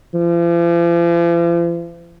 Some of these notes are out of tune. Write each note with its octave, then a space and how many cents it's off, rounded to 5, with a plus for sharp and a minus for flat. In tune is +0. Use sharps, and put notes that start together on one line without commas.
F3 -45